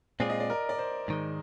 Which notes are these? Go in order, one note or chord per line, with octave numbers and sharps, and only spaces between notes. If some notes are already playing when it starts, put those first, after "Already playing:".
A#2 G#3 C4 F4 G#4 D5
D#5
D5
A#4
D5
C5
G#2 D#3 G#3